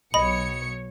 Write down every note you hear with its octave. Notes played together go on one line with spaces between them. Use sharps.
B1 C#5 D#5 B5 C#7